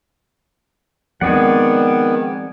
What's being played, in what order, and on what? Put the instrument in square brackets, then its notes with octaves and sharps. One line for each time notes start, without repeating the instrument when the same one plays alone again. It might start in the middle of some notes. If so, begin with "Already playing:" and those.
[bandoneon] D#3 B3 [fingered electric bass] F3 G#3 C4 [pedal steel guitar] G#4 D5 F#5